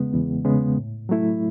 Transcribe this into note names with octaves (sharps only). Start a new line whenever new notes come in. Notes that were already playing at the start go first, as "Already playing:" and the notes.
Already playing: E2 C#3 G#3 B3
E2
C#3 G#3 B3
A2
F#3 A3 E4